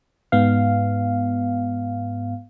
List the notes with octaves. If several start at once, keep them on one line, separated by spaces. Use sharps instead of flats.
G#2 B3 F5